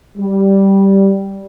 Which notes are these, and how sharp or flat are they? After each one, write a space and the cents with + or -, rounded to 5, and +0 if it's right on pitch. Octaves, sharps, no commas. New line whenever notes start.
G3 -5